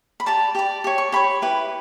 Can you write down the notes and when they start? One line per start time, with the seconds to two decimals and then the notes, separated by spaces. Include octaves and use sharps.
0.20 B5
0.26 G4 D5 A5
0.55 G4 D5
0.84 G4 C#5
0.98 C#6
1.12 G4 C#5 B5
1.42 E4 G4 B4